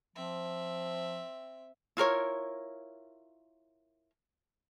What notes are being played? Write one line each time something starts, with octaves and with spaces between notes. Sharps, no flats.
F3 C4 E5
E4 F4 A#4 C#5